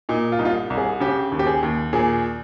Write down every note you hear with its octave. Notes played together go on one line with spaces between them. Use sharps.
A#2 D#4
F4
C2 D#4
F4
C2
G#4
C#3 G4
D#2
G4
G#4
D#2
A#2 G#4